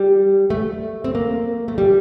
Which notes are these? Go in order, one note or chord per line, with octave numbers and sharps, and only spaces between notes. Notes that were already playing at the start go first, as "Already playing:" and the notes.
Already playing: G3
A3
C4
A#3
A3
G3